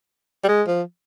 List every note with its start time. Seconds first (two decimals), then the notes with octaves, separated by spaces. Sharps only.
0.44 G3
0.49 G#3
0.68 F3